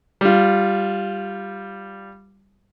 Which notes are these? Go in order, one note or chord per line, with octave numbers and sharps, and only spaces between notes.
G3 F4